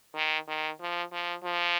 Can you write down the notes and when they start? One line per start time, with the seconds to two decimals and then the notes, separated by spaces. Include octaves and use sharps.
0.15 D#3
0.48 D#3
0.81 F3
1.12 F3
1.44 F3